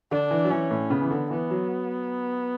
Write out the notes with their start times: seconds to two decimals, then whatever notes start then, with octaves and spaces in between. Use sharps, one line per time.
0.11 D3 D4
0.31 E3
0.45 F#3
0.51 E3 C#4
0.71 A2
0.90 C#3 B3
1.01 E3
1.11 D3
1.30 E3 B3
1.50 F#3